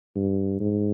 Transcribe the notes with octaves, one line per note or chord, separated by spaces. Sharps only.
G2
G#2